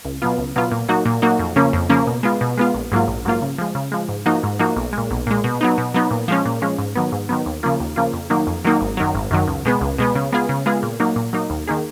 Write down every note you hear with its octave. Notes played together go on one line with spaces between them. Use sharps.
C#2
B2 F#3 B3 F4
C#2
B2 F#3 B3 F4
A#2
F#3 A#3 D#4 F#4
A#2
F#3 A#3 D#4 F#4
F2
C#3 F3 A#3 C#4
F2
C#3 F3 A#3 C#4
B2
G#3 B3 F4
B2
G#3 B3 F4
A#1
G#2 F#3 A#3 F4
A#1
G#2 F#3 A#3 F4
C#3
F3 G#3
C#3
F3 G#3
G#2
F3 A#3 D#4 F#4
G#2
F3 A#3 D#4 F#4
B1
A#2 G#3
B1
A#2 G#3
B2
F#3 B3 D#4
B2
F#3 B3 D#4
A#2
F3 G#3 C#4
A#2
F3 G#3 C#4
G#2
D#3 F#3 B3
G#2
D#3 F#3 B3
D#2
C#3 F3 A#3 F4
D#2
C#3 F3 A#3 F4
F2
D#3 F#3 A#3 D#4
F2
D#3 F#3 A#3 D#4
G#1
F#2 D#3 F#3
G#1
F#2 D#3 F#3
C#2
B2 G#3 B3
C#2
B2 G#3 B3
C#3
G#3 B3 F4 G#4
C#3
G#3 B3 F4 G#4
A#2
F#3 A#3 D#4
A#2
F#3 A#3 D#4
D#2
D#3 A#3 D#4 G#4